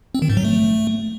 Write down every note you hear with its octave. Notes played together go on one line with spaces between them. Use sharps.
C4
D#3
G#2
F#3
A3